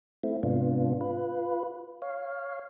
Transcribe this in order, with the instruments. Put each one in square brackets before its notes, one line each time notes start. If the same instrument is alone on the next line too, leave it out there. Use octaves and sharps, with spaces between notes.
[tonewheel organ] A3 C4 E4
G#2 C3 B3 D4 F4
F4 B4
C#5 F5